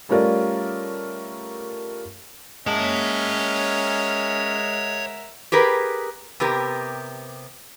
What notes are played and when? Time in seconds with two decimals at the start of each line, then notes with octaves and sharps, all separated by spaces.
0.09 G3 A3 C#4 F4 A#4 D5
2.67 G#3 C#4 A#4 C#5 E5 F#5 A5
5.52 G4 G#4 A#4 B4
6.40 C3 B3 G4 A#4